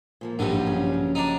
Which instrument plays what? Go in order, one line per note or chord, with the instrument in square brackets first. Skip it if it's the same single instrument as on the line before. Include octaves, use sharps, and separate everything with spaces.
[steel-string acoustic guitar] A#2 F3 A#3
[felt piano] A#1 [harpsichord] G2 D3 [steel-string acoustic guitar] F#3 D#4
[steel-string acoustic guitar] C#3 F#3 C#4
[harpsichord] D4 D#4